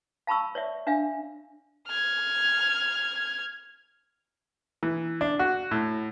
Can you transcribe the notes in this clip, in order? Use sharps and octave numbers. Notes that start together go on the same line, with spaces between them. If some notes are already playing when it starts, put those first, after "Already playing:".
F5 A5 B5 C#6 E6
C#5 D5 E5
D4 E5 F5 G#5
F6 G#6
E3
D4
F#4
A2